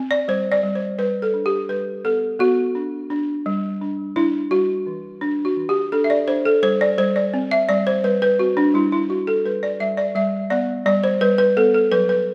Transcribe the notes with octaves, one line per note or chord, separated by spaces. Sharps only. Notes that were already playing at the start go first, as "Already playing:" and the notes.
Already playing: C4
D5
G3 C5
D5
G3
C5
G3 B4
A4
D4
G4
G3 B4
B3 A4
B3 F#4
D4
D4
G3
D4
D4 E4
G3 F#4
E3
D4
F#4
E3
G4
D4 A4
E5
D5
D4 C5
A4
G3 C5
D5
G3 C5
D5
C4
E5
G3 D5
C5
G3 B4
B4
C4 F#4
D4
G3 E4
E4
G3 F#4
A4
G3 B4
D5
G3 E5
D5
G3 E5
B3 D5
G3 D5
C5
G3 B4
B4
B3 A4
A4
F#3 B4
B4